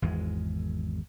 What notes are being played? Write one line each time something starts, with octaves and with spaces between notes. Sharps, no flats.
G#1 E2 G#3